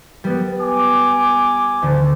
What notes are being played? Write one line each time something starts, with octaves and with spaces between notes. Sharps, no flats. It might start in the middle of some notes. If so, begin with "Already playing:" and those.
G3 B3
G#5 D6
D2 D3